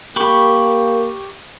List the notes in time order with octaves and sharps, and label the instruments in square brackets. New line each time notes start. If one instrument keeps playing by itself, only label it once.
[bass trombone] A#3 [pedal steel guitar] G4 B5 C#6